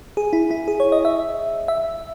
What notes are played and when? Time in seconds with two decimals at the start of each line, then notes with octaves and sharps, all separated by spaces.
0.17 G#4
0.33 E4
0.51 E4
0.68 G#4
0.80 C#5
0.92 D#5
1.05 E5
1.68 E5